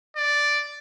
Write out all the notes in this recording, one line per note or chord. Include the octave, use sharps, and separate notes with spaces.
D5